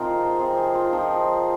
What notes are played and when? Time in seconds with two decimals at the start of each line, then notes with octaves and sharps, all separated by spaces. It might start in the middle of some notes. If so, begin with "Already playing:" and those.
Already playing: C3 F3 C4 D#4 F4 G#4 A#4 C5
0.40 F3 C4 D#4 G#4
0.57 G#4
0.75 F4
0.92 F3 C4 D#4